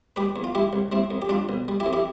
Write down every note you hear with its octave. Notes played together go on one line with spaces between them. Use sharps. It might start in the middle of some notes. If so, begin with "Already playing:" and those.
G3 G4 B4
E2
F4
G3 E4 G4
C2
G3 C4 E4
F2
G4
G3 D4 F4
B1
G3
E4 G4
F2
E4 G4